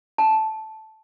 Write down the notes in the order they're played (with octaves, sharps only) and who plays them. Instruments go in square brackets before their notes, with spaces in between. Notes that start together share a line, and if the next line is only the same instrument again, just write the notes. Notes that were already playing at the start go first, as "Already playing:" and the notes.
[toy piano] A5